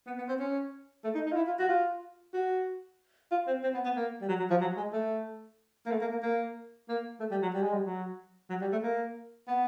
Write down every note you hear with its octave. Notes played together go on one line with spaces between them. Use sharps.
B3
B3
C4
C#4
A3
D#4
D#4
F4
E4
F4
F#4
F4
F#4
F4
C4
C4
B3
B3
A#3
G3
F#3
F#3
F3
F#3
G#3
A3
A#3
A3
A#3
A#3
A#3
A#3
A3
G3
F#3
G3
G#3
G3
F#3
F#3
G3
A3
A#3
B3